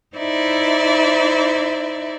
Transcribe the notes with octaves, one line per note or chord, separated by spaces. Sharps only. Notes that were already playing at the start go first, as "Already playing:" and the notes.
D#4 E4 C5 D5 E5